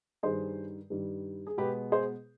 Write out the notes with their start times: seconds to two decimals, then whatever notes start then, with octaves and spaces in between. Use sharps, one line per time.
0.23 G2 D#3 G3 G#4 C5
0.90 G2 D#3 G3
1.47 G#4
1.57 B2 G#3 B3 G4 B4
1.92 G#4 C5